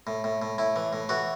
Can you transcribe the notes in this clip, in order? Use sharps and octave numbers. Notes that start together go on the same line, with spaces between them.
A2
A2
A2
A2 E4
E3
A2
E3 F#4